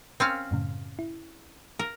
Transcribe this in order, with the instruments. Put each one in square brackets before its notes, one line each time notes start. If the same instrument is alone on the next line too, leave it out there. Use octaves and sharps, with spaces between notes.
[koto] C4 C#4 F5
[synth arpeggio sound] F#2 A2 C#3
E4
[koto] A#4